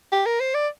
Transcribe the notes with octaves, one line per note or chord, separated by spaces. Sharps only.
G4
A#4
C5
D5